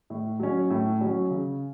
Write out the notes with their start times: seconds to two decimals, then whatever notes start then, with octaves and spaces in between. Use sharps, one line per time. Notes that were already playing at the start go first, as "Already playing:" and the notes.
0.10 A2
0.40 F#3 C#4
0.70 A2
1.01 F#3 C#4
1.30 C#3